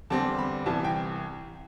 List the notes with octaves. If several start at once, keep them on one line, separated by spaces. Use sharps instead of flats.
E2 D3 G3 C4 A5
B5
C2 C3 E3 A5
G5